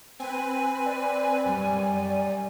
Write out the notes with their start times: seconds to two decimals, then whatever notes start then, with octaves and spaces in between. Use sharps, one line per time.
0.20 C4 B4 G#5
0.86 D5
1.45 F#2 G3